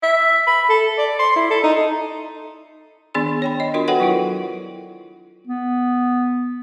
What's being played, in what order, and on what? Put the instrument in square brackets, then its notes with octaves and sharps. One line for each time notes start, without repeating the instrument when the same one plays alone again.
[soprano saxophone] E5
B5
A4
D5
C6
E4
A4
D#4
[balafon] D#3 B3 D4 G#4 D5 C6
C#5 G5 B5
D#5
D4 F4 F#4 A#4 C6
F#4 A4 B4 C#5 F#5 G5
F#3 E4 F4
[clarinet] B3